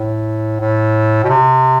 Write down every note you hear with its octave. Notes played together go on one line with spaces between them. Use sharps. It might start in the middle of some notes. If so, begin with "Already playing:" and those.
Already playing: A2
A2
B2
C3